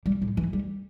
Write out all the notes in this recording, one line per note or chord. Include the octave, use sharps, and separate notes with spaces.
G3
A2
E3
G3